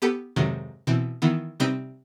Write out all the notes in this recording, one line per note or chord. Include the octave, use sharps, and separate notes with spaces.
B3 G4 A4 B4
F2 G#2 C3 D#3 F#3
B2 E3 C4
D#3 E3 B3
C3 G3 C4 D#4 B4 C5